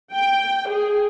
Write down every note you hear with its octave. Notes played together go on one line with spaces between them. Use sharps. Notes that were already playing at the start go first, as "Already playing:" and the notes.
G5
G#4